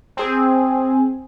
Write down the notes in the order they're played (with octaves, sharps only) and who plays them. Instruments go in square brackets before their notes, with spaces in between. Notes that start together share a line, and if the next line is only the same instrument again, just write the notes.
[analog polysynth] C4 G#4